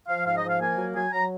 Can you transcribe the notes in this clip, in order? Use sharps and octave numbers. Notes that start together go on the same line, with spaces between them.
F3 F5
G#2 F5
D#5
F3
F5
A#3 G#5
F#3
F#3 G#5
F#3 A#5